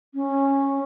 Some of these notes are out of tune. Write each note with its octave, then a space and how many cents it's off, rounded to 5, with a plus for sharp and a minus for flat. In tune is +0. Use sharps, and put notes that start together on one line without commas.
C#4 -10